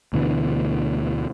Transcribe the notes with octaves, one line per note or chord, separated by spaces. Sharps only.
D2 B2 D3 E3